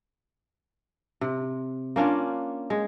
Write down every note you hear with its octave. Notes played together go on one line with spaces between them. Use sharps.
C3
A#3 C#4 D4 F4
G#3